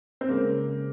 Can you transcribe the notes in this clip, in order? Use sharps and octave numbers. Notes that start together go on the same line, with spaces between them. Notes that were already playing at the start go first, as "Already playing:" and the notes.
C4
C#3 G#3 A#3 C#4 G#4